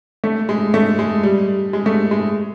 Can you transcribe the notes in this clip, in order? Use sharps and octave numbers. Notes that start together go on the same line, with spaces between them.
A3
G#3
A3
G#3
G3
G#3
A3
G#3